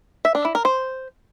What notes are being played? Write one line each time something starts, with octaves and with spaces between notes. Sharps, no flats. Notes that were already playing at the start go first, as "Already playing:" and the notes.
E5
D4
E4
A#4
C5